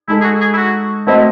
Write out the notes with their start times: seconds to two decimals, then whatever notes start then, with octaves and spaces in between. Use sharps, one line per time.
0.08 G#3 D#4 E4 A4
0.21 G#4
0.24 F#4
0.40 G#4
0.53 E4
0.57 F#4
1.07 A3 C4 E4 F#4 C5 D#5